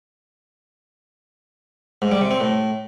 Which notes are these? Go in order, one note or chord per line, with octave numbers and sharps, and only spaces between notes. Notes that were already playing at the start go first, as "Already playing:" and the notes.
G#2
G3
C3
C4
A2